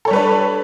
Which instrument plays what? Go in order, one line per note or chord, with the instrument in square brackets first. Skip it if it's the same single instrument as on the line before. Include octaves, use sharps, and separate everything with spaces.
[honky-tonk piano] A4
C#5
G3
B4
D4